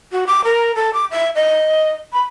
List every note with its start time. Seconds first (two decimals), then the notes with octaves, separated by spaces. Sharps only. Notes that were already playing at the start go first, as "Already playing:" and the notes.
0.12 F#4
0.27 D6
0.44 A#4
0.75 A4
0.94 D6
1.11 E5
1.35 D#5
2.13 B5